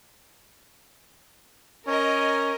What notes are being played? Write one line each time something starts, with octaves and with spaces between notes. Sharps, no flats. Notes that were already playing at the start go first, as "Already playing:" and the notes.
C#4 A#4 D#5